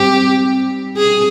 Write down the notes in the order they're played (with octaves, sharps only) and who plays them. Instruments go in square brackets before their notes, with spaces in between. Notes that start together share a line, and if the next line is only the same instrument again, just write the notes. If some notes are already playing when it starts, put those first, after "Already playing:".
Already playing: [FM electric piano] G#2 G3 C4 [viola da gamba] G4
[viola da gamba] G#4